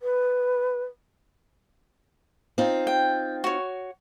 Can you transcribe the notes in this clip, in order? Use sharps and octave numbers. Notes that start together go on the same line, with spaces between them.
B4
C4 D#4 F4
G5
F#4 C#5